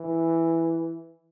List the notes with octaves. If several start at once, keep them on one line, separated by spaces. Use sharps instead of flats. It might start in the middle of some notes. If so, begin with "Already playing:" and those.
Already playing: E3